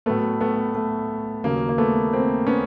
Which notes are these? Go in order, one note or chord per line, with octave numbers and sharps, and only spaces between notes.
A2 F#3 A3 B3
A3 B3
A3
D#2 C#3 F#3 A#3
A#3
A3 B3
A#3 C4
B3 C#4